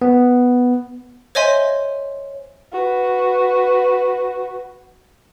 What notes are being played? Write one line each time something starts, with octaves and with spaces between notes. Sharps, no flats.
B3
C5 C#5 D#5 E5 G#5 C6
F#4 B4